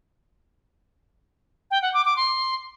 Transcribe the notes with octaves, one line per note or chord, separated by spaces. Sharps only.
G5
F#5
D6
D6
C6